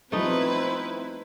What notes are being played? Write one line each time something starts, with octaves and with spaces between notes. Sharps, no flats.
F3 G3 A3 B3 C4 D#4 E4 B4